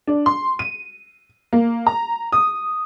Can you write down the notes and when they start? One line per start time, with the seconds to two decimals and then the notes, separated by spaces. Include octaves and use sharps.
0.07 D4
0.26 C6
0.59 D#7
1.53 A#3
1.87 A#5
2.32 D#6